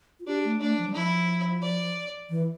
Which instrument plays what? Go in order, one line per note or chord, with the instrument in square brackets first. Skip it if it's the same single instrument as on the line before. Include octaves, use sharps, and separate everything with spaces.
[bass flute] F4
[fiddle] D4 [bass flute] G4
[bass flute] A3
[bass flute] A3 [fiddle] D4
[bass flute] F3
G3
[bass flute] F3 [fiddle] E4
[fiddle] D5
[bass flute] E3